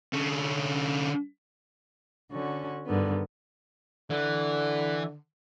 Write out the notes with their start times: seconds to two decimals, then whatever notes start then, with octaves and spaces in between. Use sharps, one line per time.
0.13 D3 C#4
2.31 D3 C#4 F#4
2.86 G2 D3 D#3 B3
4.10 D3 E3